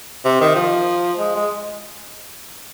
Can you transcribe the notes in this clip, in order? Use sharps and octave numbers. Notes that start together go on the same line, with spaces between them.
C3
D#3
F3
G#3
G#3